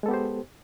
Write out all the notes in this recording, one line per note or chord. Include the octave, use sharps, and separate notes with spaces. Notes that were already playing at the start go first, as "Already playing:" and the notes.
G#3 B3 G4 A4 C5